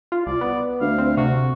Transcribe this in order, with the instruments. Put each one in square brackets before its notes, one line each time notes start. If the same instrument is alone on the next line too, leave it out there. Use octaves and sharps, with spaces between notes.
[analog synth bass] F4
[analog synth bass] C2 [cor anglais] D5
[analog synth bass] B3
[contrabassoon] D2 [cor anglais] F5
[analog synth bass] C4
[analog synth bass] C3 [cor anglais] F#4